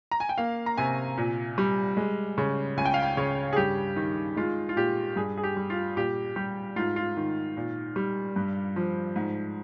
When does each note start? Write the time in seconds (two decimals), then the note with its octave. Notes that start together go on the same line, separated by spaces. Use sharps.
0.11 A#5
0.20 G#5
0.29 G5
0.38 A#3 F5
0.66 A#5
0.78 C3 G#5
1.18 A#2
1.58 G3
1.97 G#3
2.38 C#3
2.77 C#2 G#5
2.85 G5
2.94 F5
3.02 G5
3.17 C#3 C#5
3.53 G#4
3.56 G2 G4
3.96 D#3
4.37 G#3 F4
4.69 F4
4.76 A#2 G4
5.16 G2 G#4
5.37 G#4
5.43 G4
5.57 G3
5.70 F4
5.97 A#2 G4
6.36 G3 G4
6.76 G#2 F4
6.96 F4
7.17 D#3
7.57 A#2
7.96 G3
8.36 G2
8.76 F3
9.16 G#2